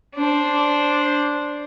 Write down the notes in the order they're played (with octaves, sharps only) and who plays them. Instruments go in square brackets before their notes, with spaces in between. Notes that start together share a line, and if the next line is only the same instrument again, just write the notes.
[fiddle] D4 C5